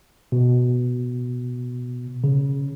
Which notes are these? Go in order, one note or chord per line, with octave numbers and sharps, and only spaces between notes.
B2
C#3